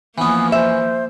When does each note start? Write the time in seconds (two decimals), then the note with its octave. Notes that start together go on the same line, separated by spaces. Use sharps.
0.18 E3 F3 A#3 B3 C#4
0.52 C5 E5